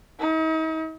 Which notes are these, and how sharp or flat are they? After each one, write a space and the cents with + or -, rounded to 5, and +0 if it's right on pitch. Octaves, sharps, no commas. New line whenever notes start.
D#4 +45